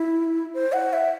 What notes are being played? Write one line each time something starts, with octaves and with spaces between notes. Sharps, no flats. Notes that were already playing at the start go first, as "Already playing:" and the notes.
Already playing: E4
C5
F#5
E5